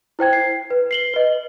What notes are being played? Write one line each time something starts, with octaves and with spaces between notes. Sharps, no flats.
E4 C5 G5 G#6
C7
B4
C7 F#7 G7
B4 D#5